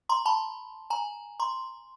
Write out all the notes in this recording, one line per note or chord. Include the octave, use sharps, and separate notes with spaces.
A#5 C6
A5 B5
G#5 A#5
A#5 C6